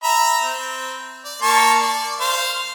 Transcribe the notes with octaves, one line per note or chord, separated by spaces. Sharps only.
E5 A#5 B5
C4
D5
A#3 A5 C#6
D5
C5 F5